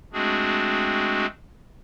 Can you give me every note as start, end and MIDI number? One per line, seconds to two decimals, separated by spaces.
0.13 1.26 56
0.13 1.26 57
0.13 1.26 60
0.13 1.26 62
0.13 1.26 66
0.13 1.26 68